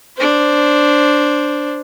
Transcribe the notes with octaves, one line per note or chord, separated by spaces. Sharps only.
D4 C5